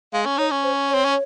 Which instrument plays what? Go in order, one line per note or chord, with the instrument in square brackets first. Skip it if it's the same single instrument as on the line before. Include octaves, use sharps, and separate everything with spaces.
[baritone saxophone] G#3 [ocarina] F5
[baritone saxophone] C#4
[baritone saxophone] D#4 [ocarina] C#5
[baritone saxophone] C#4
[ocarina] C5
[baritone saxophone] C4 [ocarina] C#5
[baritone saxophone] C#4